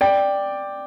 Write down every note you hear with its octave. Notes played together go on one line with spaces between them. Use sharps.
D5 G5